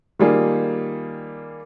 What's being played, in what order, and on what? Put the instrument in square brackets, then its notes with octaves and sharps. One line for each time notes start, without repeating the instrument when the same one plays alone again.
[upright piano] D#3 G3 A#3 F4 G#4